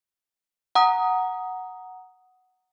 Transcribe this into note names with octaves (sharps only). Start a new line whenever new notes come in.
F#5 A#5 D#6